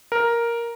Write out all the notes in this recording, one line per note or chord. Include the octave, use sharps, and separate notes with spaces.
A#4